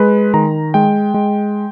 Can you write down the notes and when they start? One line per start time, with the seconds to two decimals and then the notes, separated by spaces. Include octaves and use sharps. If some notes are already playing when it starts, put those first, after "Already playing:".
Already playing: G#3 B4
0.34 D#3 A#5
0.74 G#3 G5
1.14 G#3